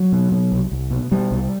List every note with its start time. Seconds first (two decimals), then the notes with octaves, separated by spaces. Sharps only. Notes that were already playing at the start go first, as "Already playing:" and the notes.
Already playing: F#3
0.12 B2
0.32 B2
0.52 C2
0.72 C2
0.91 B2
1.11 B2 G3
1.31 C2